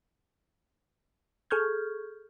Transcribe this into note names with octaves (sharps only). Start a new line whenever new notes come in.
G#4 A4 C#6 F6 G6 G#6